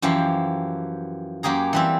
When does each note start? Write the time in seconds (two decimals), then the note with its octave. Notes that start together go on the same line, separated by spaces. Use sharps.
0.02 F#2 E3 F3 G4 F5
1.43 F#2 A#3 G4 G#4 A#5
1.73 E3 G3 C4